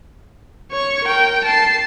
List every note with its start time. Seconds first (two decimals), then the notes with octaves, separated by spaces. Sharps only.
0.72 C#5 C#6
1.05 A#4 G5
1.45 A5 C7